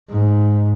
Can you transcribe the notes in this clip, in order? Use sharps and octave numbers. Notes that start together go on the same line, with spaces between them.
G#2